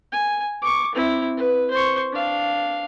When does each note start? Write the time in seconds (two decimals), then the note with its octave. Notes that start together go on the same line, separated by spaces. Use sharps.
0.12 G#5
0.62 C#6 D6
0.95 C4 E4
1.37 B4
1.71 C5 C#6
2.13 D4 F5